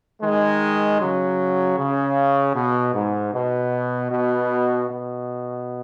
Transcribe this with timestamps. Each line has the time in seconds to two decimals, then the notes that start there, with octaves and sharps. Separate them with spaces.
0.22 D#3 G#3
1.00 C#3 F#3
1.78 C#3
2.55 B2
2.94 G#2
3.33 B2
4.11 B2
4.89 B2